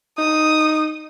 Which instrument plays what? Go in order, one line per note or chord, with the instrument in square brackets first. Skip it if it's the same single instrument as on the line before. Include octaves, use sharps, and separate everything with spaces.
[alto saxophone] D#4 [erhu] D#6